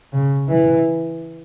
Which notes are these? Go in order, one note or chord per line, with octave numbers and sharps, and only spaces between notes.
C#3
E3